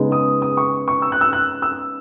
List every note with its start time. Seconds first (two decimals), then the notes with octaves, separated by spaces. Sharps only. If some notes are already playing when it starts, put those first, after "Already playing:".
Already playing: C#3 G#3 B3 D#4
0.12 D#6
0.42 D#6
0.57 C#6
0.88 C#6
1.02 E6
1.12 F#6
1.21 E6
1.33 F#6
1.62 E6